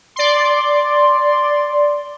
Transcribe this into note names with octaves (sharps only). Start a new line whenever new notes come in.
D5 C6